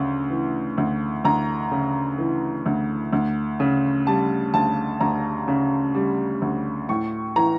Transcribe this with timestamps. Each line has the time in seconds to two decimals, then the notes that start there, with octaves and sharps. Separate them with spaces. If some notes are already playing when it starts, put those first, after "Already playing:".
Already playing: D2 C#3
0.30 E3
0.78 D2
1.25 D2 A#5
1.71 C#3
2.18 E3
2.66 D2
3.13 D2
3.60 C#3
4.07 G3 A5
4.54 D2 A5
5.01 D2 A#5
5.48 C#3
5.95 G3
6.42 D2
6.89 A2 C#6
7.36 E3 A#5